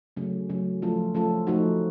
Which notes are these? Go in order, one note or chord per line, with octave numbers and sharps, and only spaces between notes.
C#3 F#3 A3 C#4
C#3 F#3 A3 C#4
F3 A3 C#4 F4 A4
F3 A3 C#4 F4 A4
F3 A3 D#4 F#4